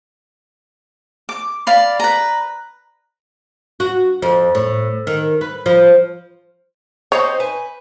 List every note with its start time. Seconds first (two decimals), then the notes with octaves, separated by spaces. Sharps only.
1.29 D6
1.67 D5 F5 B5
2.00 B4 A#5
3.80 F#4
4.22 F2
4.55 A2
5.07 D#3
5.41 B4
5.66 F3
7.12 C4 D#4 C5 C#5
7.40 B4 G#5